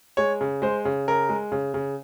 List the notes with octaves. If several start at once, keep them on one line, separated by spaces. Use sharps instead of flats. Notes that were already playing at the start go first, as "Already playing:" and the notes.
G#3 C#5
C#3
G#3 C5
C#3
C#3 A#4
G#3
C#3
C#3